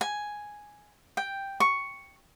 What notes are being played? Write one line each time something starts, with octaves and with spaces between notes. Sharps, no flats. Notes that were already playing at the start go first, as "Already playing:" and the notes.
G#5
G5
C#6